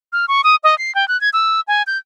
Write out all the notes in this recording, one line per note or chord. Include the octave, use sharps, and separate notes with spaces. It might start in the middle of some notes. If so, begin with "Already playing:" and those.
F6
C#6
D#6
D#5
C7
G5
F#6
G#6
E6
G#5
G6